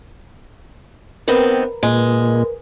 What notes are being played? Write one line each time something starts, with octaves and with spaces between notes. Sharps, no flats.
D#3 B3 C4 A#4 B4
A#2 G#3